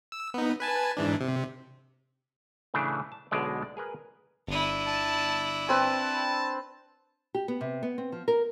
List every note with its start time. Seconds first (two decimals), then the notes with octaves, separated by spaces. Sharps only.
0.12 E6
0.34 B3 D#4
0.60 B4 G#5 A5
0.97 G#2 E3 D4
1.20 C3
2.74 A2 C#3 E3 A3 D4
3.12 A5
3.31 B1 B2 D3 G#3 D5
3.62 D5
3.77 G#4 A#4 B4
4.48 G1 D4 E4 D#7
4.87 A5
5.69 C4 B4 A5
7.34 G4
7.48 B3
7.61 C3
7.83 B3
7.98 C4
8.12 F3
8.28 A#4